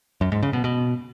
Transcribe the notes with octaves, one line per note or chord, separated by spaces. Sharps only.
F#2
G#2
C#3
B2
B2